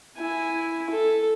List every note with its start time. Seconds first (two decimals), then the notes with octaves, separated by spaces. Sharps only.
0.18 E4 G#5
0.90 A4